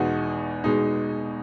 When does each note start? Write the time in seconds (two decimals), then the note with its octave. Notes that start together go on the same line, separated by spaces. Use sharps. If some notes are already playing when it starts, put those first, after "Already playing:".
Already playing: E2 B2 G#3 D#4 F#4 F#5
0.64 B2 G#3 D#4